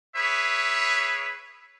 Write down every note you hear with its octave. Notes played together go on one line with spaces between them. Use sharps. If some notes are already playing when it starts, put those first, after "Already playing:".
G#4 B4 C#5 E5